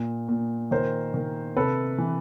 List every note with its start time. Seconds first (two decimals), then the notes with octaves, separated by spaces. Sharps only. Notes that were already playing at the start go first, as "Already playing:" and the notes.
Already playing: A#2
0.29 A#2
0.71 D#3 A#4 C5
1.14 D#3
1.56 C3 A4 B4
1.98 E3